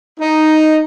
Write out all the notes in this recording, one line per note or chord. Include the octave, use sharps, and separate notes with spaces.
D#4